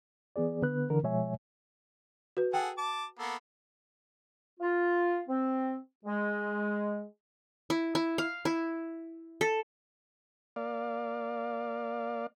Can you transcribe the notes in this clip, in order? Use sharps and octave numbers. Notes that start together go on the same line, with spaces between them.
E3 B3 G#4 D5
D3 B3 B4 F#6
D3 E3 A#4
B2 F3 G#3 C#5 E5 G#5
F#4 B4
G#4 A4 F#5 G5
A5 D6
A#3 B3 A4
F4
C4
G#3
E4
E4
F5
E4
A4
A#3 D5 F5